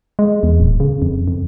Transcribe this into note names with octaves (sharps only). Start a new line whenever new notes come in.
G#3
E2
D1
C#3
F2
F2